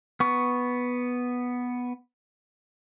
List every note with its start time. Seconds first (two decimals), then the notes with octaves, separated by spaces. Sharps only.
0.20 B3 C#6